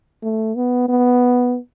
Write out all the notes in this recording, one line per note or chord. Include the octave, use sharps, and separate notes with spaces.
A3
B3
B3